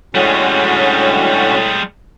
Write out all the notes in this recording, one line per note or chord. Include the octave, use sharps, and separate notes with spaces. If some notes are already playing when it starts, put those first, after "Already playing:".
A2 D3 G3 G#3 C#4 F#4